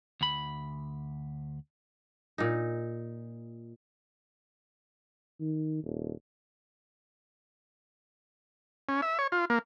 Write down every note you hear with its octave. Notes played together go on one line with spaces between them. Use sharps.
D2 B5
A#2 D#4
D#3
D#1
C#4
E5
C#5
F4
A#3